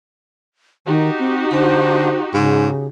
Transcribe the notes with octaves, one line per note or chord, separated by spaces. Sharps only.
D#3 D#4 F#4 G4
C4
D3 C5
G#2 C#3